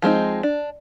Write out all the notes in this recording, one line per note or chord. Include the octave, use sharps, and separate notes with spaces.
F3 G#3 C4 D#4
D4